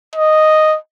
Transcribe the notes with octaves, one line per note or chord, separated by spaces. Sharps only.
D#5